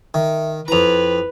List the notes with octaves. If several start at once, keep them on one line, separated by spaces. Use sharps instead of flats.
D#3 E5
F2 E4 B4 A#5 F7